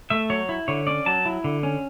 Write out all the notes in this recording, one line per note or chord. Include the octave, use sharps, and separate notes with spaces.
A3 E5
F#3 C#5
E4
D3 C#5
C#4 D5
F#3 A5
E4
D3
C#4